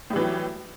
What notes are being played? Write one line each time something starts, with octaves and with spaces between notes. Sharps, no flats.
A2 E3 F#3 G3